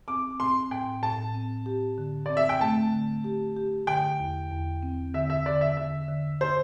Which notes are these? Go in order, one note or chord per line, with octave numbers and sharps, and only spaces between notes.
C4 D6
C4 C6
A2 G5
A2 A5
C4
G4
D3
C4 D5
E5
G5
A3 A5
D3
G4
G4
D3 G5
E2
E2
C4
D3 E5
E5
D3 D5
E5
D3 E5
D3
C5